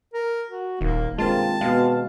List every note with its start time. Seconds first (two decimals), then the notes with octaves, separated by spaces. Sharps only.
0.14 A#4
0.49 F#4
0.81 D#1 D#3 A#3
1.18 G2 C3 G#3 A#3 C4 F4 A5
1.61 B2 G#3 F5